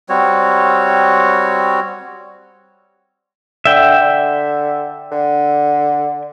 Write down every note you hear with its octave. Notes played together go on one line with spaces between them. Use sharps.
G3 C4 F#4 C#5
D3 E5 G5
D3
D3